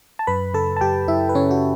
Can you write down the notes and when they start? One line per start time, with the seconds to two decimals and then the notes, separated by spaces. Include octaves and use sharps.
0.19 A5
0.27 F#2 B4 B5
0.54 C#3 A4 A5
0.77 A5
0.81 F#2 G4 G5
1.08 F#2 E4 E5
1.29 B4
1.35 C#3 C#4 C#5
1.51 F#4